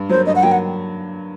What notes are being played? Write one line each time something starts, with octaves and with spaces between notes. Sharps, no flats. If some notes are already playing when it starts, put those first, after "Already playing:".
Already playing: G2
F#3 A#3 C5
G2 D#5
F#5
F#3 A#3 G5
F#5